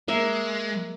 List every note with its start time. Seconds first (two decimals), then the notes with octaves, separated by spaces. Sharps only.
0.08 G#3 A#3 E5